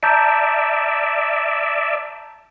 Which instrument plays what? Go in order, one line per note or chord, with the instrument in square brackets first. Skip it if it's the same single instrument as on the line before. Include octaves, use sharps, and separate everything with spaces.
[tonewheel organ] D5 E5 [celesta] A5 A#5 G6